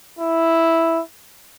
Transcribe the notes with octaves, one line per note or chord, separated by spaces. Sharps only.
E4